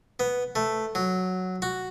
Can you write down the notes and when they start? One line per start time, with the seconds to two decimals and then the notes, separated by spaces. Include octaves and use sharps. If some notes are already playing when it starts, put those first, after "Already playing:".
0.20 B3
0.56 A3
0.95 F#3
1.62 F#4